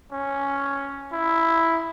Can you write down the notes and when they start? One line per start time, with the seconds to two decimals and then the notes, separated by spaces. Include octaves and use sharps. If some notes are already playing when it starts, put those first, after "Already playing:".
0.13 C#4
1.12 E4